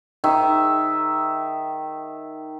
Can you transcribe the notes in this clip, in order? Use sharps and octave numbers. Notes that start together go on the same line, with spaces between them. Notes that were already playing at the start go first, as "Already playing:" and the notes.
D#3 E5